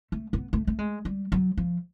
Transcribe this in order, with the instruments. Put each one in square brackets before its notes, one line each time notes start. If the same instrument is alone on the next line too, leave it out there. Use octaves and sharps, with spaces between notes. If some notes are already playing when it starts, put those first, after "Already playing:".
[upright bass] A3
B3
A3
A3
G#3
G3
F#3
F3